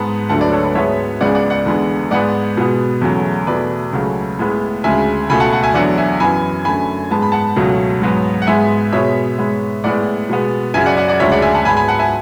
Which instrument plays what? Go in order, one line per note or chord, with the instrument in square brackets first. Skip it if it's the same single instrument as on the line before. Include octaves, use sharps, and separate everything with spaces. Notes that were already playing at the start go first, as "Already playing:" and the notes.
Already playing: [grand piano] G#2 G#3 B3 F#5 A5
D2 D3 F#3 A3 F#5 A5
B4 D5
A4 C#5
B4 D5
G#2 G#3 B3 C#5 E5
C#2 C#3 G#3 B3 D5 F#5
D5 F#5
D5 F#5
E2 D3 G#3 B3
G#2 G#3 B3 D5 F#5
B2 G#3 B3
E2 C#3 F#3 A3
E2 B2 A3 B4 D5
C#2 C#3 F#3 A3
A2 G#3 B3
D2 C#3 G#3 E5 G#5
C#2 B2 A3 G#5 B5
F#5 A5
F#5 A5
E5 G#5
E2 D3 F#3 D5 F#5
E5 G#5
F#2 E3 B3 G#5 B5
F#2 D3 A3 G#5 B5
G#2 G#3 B3 A5
B5
F#5 A5
C#2 B2 F#3 A3
G#2 F#3 B3
F#5
G#2 G#3 B3 E5 G#5
B2 G#3 B3 C#5 E5
G#2 G#3 B3
A2 G#3 B3 D5 F#5
B2 G#3 B3
F#2 C#3 F#3 E5 G#5
D5 F#5
D5 F#5
D5 F#5
D2 C#3 G#3 C#5 E5
D5 F#5
E5 G#5
F#5 A5
G#2 G#3 B3 G#5 B5
G#5 B5
F#5 A5
E5 G#5